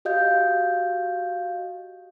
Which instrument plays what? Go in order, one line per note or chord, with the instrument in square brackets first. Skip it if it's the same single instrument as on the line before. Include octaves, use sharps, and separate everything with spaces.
[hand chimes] F#4 G4 D#5 F5 G6